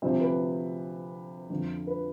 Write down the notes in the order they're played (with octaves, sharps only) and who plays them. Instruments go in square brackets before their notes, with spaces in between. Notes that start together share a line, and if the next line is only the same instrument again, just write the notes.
[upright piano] D2 C3 F3 C5
B4
F2 D3 F3
B4